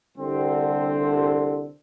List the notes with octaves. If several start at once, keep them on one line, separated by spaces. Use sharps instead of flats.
C2 D3 C4